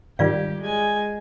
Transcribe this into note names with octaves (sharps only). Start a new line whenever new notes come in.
G#2 D#3 G3 F4 G4 D5 F5
G#3 G#5